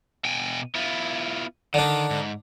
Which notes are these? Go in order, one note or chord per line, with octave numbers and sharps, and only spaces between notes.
B2 G5 G#5
B3 E4 F4
D3 D#3 D4
G#2